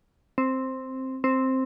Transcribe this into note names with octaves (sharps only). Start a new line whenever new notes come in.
C4
C4